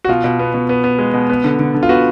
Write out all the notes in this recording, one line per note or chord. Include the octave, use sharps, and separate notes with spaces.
F#4
B2 F4
B2
B3
B2
B3
B3
G#3
B2
B3
D3
D3
D3
F4
B3 F#4